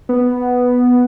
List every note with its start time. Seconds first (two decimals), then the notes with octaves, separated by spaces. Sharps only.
0.09 B3